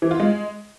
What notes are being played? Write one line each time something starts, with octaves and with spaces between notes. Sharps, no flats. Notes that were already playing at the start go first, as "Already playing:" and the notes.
E3
F4
G#3